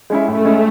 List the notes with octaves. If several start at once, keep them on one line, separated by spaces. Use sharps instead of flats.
G#3 C#4 E4
A2 A3
G#3 C#4 E4